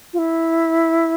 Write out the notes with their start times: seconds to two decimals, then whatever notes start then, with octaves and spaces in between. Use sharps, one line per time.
0.13 F4
0.19 E4